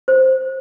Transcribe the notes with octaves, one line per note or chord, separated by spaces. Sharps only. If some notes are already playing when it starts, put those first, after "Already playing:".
C5